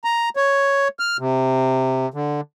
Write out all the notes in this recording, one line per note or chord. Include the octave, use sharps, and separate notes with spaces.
A#5
C#5
F6
C3
D3